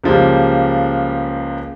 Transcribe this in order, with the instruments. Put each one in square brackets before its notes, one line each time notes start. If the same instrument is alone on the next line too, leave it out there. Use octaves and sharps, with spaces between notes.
[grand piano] C#2 C#3 F3 G3 A#3